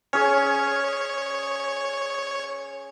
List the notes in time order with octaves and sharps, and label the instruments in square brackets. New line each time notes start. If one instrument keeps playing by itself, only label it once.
[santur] C#4 G#4 [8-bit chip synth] C#5